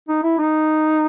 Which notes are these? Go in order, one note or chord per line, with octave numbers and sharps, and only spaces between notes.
D#4
E4
D#4